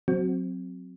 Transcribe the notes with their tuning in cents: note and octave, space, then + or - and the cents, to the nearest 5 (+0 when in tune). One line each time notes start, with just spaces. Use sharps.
F#3 -15 C4 +0 F#4 +0